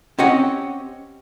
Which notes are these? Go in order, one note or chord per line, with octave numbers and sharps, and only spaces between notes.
C4 C#4 G4 D#5 F#5